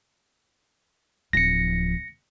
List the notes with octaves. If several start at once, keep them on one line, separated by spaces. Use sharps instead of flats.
D1 F3 A#6 C#7